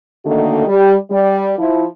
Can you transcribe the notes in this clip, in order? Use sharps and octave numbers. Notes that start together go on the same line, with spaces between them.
D3 D#3 A3 A#3 F#4 D#5
G3
G3 D5
F3 E4